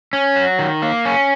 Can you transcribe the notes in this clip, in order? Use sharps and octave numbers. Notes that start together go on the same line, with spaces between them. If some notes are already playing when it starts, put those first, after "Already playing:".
C#4
F#3
D#3
A#3
C#4